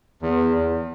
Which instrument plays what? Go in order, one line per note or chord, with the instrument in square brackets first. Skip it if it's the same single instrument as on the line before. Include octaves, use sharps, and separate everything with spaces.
[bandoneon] E2